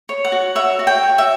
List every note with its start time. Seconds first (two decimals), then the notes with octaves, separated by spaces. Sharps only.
0.09 C#5
0.25 F#5
0.32 F#4
0.55 C#5 E5
0.79 F#4
0.87 G5
1.03 C#5
1.18 E5